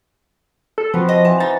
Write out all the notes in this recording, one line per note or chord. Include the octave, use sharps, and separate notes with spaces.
A4
F3 C4 F#4 B4
D#5
E3 C4 F#4 A5
D#4 A6